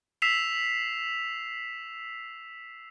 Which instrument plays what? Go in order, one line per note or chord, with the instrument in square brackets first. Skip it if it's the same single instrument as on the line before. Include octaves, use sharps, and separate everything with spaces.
[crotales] E6 B6 C7 E7 F7